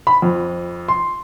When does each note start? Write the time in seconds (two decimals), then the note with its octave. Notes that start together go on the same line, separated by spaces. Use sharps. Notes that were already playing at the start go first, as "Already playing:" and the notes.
0.07 B5
0.22 F2
0.88 C6